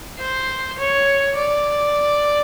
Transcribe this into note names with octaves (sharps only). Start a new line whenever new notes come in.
C5
C#5
D5